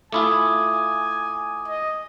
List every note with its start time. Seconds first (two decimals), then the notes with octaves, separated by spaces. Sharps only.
0.12 A3 E4 F4 G#5 D6 D#6
1.68 D#5